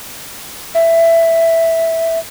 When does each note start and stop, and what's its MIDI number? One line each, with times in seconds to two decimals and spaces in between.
0.75 2.19 76